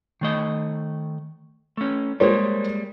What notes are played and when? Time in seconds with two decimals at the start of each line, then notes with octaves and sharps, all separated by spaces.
0.21 D#3 A3 D#5
1.77 A3 C#4
2.20 G3 G#3 A#3 A#4 C5 C#5